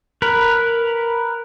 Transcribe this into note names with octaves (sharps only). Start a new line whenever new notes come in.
A#4 B4